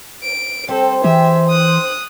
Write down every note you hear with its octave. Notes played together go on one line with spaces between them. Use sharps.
D7
G3 C4 A4 C5
E3 G4 G#4 E5
D#6 F#6